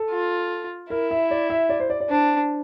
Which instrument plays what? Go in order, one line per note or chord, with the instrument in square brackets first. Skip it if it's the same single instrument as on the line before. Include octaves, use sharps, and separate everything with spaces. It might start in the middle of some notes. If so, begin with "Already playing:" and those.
Already playing: [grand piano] A4
[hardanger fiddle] F4
[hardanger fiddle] E4 [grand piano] A#4
[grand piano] E5
D5
E5
D5
C5
D5
D5
[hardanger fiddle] D4 [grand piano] C5